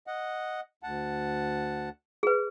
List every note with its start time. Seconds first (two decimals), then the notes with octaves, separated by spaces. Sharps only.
0.07 D#5 F#5
0.83 D2 F#5 A5
2.23 G#4 B4